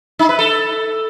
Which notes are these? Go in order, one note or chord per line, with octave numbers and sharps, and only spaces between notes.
D#4
B4
A4